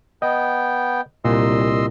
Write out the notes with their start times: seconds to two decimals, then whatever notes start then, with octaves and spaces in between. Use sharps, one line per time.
0.22 B3 D#5 G5
1.25 C2 A#2 D#5 C6 E6